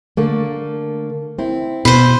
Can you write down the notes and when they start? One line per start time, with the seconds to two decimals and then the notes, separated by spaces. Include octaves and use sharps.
0.17 D3 A3 A#3
1.39 C4 E4
1.85 B2 B4 C5